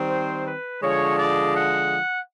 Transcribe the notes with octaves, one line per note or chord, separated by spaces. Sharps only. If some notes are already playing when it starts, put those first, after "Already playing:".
Already playing: D#3 G3 C4
C5
B4
D3 F3 G#3 C#5
D5
F#5